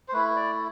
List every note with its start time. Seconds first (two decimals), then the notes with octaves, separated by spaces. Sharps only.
0.08 C5
0.13 A3 E4 B4
0.35 D5